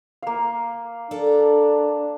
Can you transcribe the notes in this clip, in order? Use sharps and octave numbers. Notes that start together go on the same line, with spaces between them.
A#3 F5
D4 A4 A#4 D5